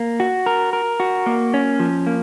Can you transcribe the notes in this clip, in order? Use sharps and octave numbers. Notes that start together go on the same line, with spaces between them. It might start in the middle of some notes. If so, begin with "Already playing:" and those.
Already playing: A#3
F#4
A#4
A#4
F#4
A#3
C#4
F3
A#3